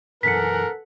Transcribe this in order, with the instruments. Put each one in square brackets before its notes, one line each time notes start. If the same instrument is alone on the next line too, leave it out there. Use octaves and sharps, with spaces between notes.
[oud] F#2 B2 E3 [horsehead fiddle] A4 F#5 [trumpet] A#4 [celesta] B6 C#7